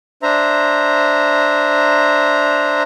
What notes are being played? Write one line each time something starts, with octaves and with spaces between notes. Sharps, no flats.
D4 C5 E5 A#5